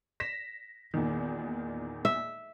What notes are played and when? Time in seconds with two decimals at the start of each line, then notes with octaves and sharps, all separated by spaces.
0.20 A#6 B6 E7
0.94 E2 A#2 D#3
2.05 E5